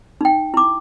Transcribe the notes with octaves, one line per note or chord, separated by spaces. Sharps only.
D#4 G5
E4 D6